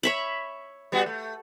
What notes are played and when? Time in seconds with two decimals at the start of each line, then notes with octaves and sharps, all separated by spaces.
0.03 C#5 E5 B5
0.92 G3 B3 F#4
1.06 A3